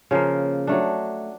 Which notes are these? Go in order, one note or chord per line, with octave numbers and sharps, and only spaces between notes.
C#3 F3 A#3
F#3 A3 D4